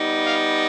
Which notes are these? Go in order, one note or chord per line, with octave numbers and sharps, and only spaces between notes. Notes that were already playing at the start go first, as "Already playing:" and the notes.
Already playing: G3 B3 D#4
F5